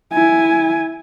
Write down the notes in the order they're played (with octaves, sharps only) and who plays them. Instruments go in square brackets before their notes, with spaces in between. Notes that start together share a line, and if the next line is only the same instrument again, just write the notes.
[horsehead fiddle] E4 G#5